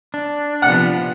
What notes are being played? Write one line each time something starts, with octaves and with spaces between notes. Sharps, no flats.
D4
C3 F3 B3 F#5